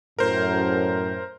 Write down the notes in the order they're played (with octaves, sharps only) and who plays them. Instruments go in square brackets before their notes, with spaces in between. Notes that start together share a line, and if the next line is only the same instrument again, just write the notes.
[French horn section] F#2 A2 [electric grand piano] A#4 C5